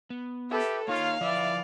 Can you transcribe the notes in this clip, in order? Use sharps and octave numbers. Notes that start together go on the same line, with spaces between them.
B3
G4 A4 B4 E5
A#3 D#4 F4 C#5 F5
F3 E4 B4 D5 E5